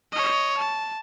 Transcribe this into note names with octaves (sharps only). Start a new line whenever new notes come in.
C#5 D#5
A5